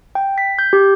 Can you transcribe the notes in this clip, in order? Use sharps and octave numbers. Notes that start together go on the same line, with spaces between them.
G5
B6
G6
G4